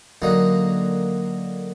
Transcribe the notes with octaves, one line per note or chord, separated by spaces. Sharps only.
D3 F#3 A#3 D#4